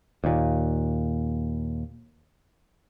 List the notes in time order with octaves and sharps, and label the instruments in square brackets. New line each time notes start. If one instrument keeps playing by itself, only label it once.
[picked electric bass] D#2 A#2